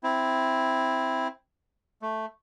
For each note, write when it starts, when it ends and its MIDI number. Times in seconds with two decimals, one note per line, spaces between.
0.03 1.28 60
0.03 1.28 64
2.02 2.26 57